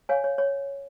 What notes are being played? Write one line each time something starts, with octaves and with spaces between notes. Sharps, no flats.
C#5 F5 G#5
C#5
C#5